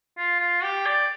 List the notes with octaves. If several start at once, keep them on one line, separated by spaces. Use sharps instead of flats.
F4
F4
G4
D5